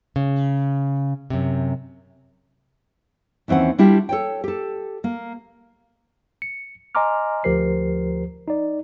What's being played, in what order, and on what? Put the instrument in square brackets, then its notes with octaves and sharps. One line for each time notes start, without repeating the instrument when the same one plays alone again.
[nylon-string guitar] C#3
F#2 C3
D#2 E3 C4 C#4 F#5
G3 D4 E4 F4 G4
A4 C#5 G5
G4 A4
A#3
[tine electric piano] C#7
D#5 G#5 A#5 C6 D6 F6
D2 F3 G4 A#4 C5 C7
D#4 D5